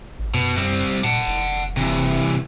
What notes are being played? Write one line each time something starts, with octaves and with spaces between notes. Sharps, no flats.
G#1
F#2 B2
G3 C4
A#2 F#5 A5
F1
C3 E3